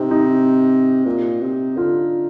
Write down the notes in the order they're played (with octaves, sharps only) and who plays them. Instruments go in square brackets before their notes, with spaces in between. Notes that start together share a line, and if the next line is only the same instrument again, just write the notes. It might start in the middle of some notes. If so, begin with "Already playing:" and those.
Already playing: [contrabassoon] C3 [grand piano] C4 D#4
[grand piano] D#4
[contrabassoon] A#2
C3
[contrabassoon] D3 [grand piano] F4